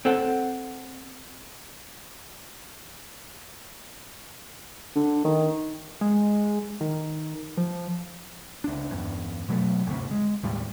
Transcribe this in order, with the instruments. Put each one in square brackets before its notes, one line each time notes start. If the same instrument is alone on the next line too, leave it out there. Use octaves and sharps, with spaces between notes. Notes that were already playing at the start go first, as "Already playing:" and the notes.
[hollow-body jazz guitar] C4 A4 F#5
[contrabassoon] D3
D#3
[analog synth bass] G#3
D#3
F3
[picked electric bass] C#2 D4
E2 G2
B2 F#3 G3 A3
G1 D2 C3
G#3
D#2 A2 G3